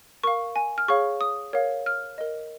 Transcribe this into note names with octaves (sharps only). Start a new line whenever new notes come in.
A#4 F5 C#6
G#5
F6
G#4 C#5 F5 C#6
D#6
A#4 C#5 F5
F6
A#4 D#5